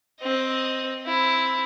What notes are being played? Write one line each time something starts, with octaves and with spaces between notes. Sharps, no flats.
C4 D#5
C4 E4